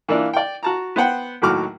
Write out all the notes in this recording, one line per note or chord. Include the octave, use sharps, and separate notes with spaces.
E3 A#3 D4 E4 F4
D5 G5
F#4 A5 A#5
B3 C5 F#5 G5
D#2 A2 F#3 F#4 D6 F6